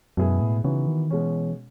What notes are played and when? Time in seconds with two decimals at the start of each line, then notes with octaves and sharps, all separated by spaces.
0.17 F#2 B2 G#3 B3 E4 G#4
0.40 A2
0.64 C#3 E3 B3 D#4 F#4
0.88 D#3
1.10 B2 E3 G#3 C#4